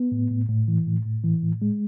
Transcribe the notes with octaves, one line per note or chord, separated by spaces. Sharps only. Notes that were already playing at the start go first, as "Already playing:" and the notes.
Already playing: B3
A2
A2
A2
E3
A2
A2
E3
A2
G#3